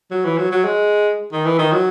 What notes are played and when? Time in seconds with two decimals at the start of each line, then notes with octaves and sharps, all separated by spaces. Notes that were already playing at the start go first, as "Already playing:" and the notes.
0.11 F#3
0.25 E3
0.38 F#3
0.51 F#3
0.64 G#3
1.32 D#3
1.45 E3
1.59 D#3
1.72 F#3